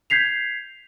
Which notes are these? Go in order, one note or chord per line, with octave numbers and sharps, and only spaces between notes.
G6 G#6 B6 C7 F7